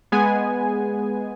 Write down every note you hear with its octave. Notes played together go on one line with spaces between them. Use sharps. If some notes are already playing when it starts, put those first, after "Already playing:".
G#3 B3 G#4 G#5